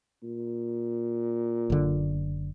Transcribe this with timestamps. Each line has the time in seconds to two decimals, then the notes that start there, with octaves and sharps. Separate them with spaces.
0.23 A#2
1.70 F#1 D3